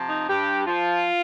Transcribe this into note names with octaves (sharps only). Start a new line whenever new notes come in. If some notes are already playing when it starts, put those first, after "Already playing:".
Already playing: C3 F3
D#4
G2 G4
F3 F4